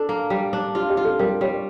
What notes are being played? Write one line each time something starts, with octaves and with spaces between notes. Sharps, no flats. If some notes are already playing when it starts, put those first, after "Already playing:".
Already playing: D4 A4
A#3
G3
D4
F4 G4
G4
F4
A4
G3 A#4
G3 C#5